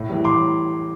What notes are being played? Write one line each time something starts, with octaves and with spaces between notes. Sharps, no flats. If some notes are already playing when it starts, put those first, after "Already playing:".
Already playing: A2
E3 G3
A2 C6 D6